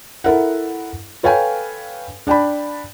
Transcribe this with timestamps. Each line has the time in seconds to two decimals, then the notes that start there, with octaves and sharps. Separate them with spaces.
0.24 E4 A4 A#4 E5 F#5
1.23 A4 B4 C#5 F5 G5 G#5
2.27 D4 D5 G5 A5 B5